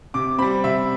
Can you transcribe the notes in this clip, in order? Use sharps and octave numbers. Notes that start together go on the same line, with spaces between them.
C3 D6
G3 C4 B5
C3 E5